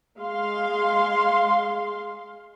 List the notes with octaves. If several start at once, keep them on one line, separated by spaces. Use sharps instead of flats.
G#3 F5 C6